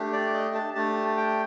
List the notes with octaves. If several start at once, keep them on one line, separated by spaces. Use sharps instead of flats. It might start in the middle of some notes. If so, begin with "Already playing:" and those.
Already playing: A3 D4 G4
D5
D#5
A5
A3 D4 G4 A5
G5